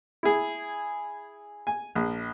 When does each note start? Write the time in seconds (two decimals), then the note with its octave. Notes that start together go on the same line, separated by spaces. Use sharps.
0.23 E4 G#4
1.67 G#5
1.95 A#1